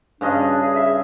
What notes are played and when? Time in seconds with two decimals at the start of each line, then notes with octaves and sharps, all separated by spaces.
0.21 G2 C#3 D4 D#5
0.60 G#4
0.76 E5